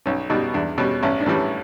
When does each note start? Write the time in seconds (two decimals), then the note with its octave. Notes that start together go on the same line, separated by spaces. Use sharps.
0.06 B1 C#4
0.30 B2 G3 D#4
0.54 E2 D4
0.78 B2 G3 C#4
1.03 A1 C#4
1.21 D4
1.26 A2 E3 G3 C#4